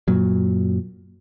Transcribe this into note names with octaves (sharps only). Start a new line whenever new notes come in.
F#2 A#2 F#3